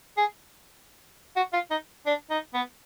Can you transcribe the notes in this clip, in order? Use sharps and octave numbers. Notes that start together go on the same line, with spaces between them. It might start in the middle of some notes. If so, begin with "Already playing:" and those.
G#4
F#4
F4
D#4
D4
D#4
B3